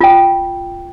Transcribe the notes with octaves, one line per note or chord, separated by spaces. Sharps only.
F4 G5